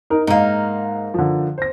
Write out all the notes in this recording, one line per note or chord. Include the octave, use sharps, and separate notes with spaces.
D#4 A#4
G#2 A#3 D#4 F5
D3 F3
C5 A#6